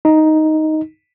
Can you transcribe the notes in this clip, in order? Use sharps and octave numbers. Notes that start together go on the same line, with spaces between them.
D#4